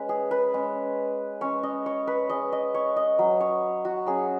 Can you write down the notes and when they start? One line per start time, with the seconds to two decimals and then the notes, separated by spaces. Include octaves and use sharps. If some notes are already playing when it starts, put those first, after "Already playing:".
Already playing: G#3 C#4 B4
0.09 G#4
0.31 B4
0.54 G#3 C#4
1.41 G#3 C#4 C#5
1.63 D#5
1.86 C#5
2.07 B4
2.29 G#3 C#4 D#5
2.52 D#5
2.74 C#5
2.96 D#5
3.19 F#3 C#4
3.41 C#5
3.85 F#4
4.06 F#3 C#4 G#4